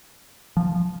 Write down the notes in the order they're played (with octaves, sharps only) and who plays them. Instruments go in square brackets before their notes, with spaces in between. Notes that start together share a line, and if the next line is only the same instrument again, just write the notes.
[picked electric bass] F3